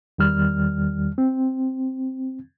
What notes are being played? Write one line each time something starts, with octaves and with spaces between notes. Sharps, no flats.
E2 D#3 G3 F6
C4